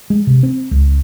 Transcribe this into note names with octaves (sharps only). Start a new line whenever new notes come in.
G#3
C3
C4
C#2